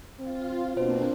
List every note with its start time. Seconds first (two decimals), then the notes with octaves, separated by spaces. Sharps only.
0.20 C4 F4
0.77 B2 A#3 C4 D4 C5